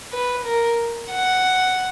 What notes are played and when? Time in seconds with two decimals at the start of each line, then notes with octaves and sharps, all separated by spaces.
0.12 B4
0.45 A#4
1.10 F#5